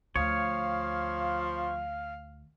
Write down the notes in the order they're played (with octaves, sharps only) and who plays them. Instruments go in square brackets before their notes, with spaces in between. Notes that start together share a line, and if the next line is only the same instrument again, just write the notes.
[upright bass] D2 [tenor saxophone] F3 [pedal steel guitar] C#5 [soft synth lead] F5